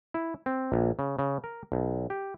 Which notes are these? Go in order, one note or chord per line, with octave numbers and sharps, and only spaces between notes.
E4
C4
A#1
C#3
C#3
A#4
B1
G4